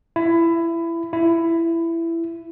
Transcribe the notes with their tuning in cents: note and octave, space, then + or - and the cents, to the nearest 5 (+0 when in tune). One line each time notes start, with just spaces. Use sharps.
E4 +20
E4 +15